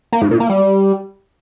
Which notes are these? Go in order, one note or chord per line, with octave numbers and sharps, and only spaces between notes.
A#3
G#2
A#2
A#3
G3